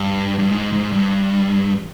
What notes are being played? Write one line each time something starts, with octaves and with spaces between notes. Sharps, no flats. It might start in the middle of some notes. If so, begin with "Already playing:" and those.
Already playing: G2
G2
G#2
G#2
G2